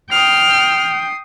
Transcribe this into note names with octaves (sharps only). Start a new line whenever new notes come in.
G5 D#6 F6 C7